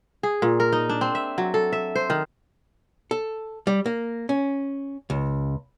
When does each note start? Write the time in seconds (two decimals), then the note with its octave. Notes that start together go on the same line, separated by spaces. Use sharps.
0.23 G#4
0.42 A#2
0.60 A#4
0.72 D#4
0.89 D4
1.01 C4
1.15 E5
1.38 F#3
1.54 A4
1.73 E5
1.95 C5
2.10 D#3
3.11 A4
3.67 G3
3.86 A#3
4.29 C#4
5.10 C#2